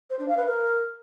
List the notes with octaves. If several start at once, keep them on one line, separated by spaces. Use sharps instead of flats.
C5
D4
F5
B4
A#4